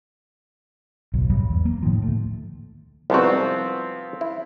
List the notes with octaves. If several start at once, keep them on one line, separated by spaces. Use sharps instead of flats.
D1 B1
G#1 F#2 G3
E2
A#3
A2 D#3 F3
D2 A3
C2 G#2 F3 B3 C4 F#4
E4